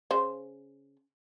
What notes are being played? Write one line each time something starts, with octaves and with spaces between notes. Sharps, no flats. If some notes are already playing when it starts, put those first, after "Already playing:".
C#3 C5